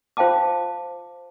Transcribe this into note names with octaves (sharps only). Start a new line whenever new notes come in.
F4 C5 F5 G5 A5 D6